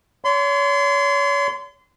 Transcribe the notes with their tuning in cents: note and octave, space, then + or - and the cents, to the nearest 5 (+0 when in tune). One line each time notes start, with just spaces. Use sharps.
C#5 +35 C6 -30